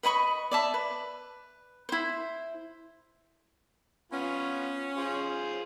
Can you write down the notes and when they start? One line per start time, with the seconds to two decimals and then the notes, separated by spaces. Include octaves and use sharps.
0.03 B4 D#5 B5 C#6
0.51 D5 E5 A5
0.74 B4
1.89 E4 C5
4.12 B3 C#4 F4 B4
4.98 F4 G#4 C5